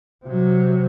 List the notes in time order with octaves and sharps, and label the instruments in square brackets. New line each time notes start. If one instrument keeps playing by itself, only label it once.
[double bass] C3 F#3